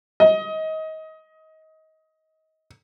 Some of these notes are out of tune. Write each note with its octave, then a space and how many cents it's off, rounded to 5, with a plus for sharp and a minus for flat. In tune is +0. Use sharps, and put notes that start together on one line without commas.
D#5 +25